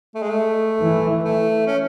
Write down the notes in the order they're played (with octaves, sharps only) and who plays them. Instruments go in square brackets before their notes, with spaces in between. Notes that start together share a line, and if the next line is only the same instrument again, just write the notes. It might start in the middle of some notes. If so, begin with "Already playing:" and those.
[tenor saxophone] A3
G#3
A3
[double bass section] E3
[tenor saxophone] A3
C#4